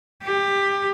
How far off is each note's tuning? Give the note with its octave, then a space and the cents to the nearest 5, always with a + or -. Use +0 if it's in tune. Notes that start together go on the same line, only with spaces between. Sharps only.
G4 +15